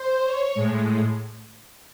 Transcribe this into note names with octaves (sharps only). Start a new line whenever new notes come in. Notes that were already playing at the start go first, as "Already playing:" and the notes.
Already playing: C5
C#5
A2 G#3